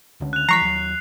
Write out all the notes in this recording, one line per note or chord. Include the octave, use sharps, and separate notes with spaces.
C#2 D3 C#4
F#6 F7
E3 F3 G3 A#5 C#6 B6 C7
D#2 F#3